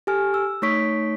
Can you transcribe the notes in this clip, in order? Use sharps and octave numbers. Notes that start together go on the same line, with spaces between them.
G4 A4 G#5 F6
E6
A3 D#4 C#5 C#6 B6 D7